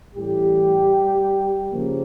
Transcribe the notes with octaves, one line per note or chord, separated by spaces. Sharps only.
A1 A2 E3 G3 G4
C#3 F3 A#3